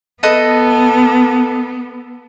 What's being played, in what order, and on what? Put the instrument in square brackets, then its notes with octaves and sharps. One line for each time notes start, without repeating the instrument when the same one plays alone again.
[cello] B3 [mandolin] A4 B4 D#5